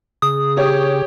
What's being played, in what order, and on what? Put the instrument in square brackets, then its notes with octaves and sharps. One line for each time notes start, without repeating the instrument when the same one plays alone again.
[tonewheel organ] C#3 G#4 [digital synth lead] D#6
[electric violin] G4 [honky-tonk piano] C#5